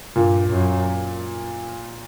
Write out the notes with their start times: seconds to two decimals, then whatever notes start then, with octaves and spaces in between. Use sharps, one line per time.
0.15 G2 A#2
0.50 F#2